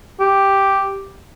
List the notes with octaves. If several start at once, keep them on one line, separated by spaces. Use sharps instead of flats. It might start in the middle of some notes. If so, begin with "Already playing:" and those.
G4